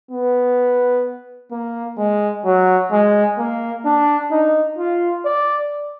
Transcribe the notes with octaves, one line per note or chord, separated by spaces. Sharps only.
B3
A#3
G#3
F#3
G#3
A#3
D4
D#4
F4
D5